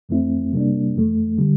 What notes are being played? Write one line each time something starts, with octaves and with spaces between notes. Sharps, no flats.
F2 E3 A3 C4 E4
C3 G3 A#3 D4
F2 E3 A3
D3 G3